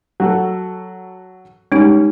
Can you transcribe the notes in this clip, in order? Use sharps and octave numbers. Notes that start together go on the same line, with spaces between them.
F#3 F#4 A4
G3 G#3 C#4 D#4